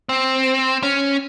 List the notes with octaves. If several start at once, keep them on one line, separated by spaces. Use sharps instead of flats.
C4
C#4